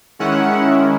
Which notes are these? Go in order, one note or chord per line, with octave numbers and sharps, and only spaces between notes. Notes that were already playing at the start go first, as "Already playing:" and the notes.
D#3 G#3 C#4 E4 F#5